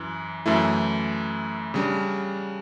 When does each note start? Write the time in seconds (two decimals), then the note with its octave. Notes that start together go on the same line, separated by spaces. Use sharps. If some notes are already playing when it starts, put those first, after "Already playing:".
Already playing: F#2 E3
0.46 F#2 E3 A3 E4
1.74 C#3 G3 D4